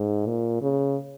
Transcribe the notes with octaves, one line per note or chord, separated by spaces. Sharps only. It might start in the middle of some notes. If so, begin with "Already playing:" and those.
Already playing: G#2
A#2
C#3